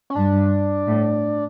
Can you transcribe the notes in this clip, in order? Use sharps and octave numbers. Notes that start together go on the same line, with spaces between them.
C#4
G2 D4
A2